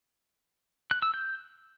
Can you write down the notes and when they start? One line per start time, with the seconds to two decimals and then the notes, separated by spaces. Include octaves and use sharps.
0.91 F#6
1.02 E6
1.14 G6